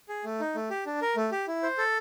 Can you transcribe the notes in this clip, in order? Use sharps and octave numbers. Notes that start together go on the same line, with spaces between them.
G#4
A3
D#4
A3
G4
D4
A#4
A3
G4
E4
C5
A4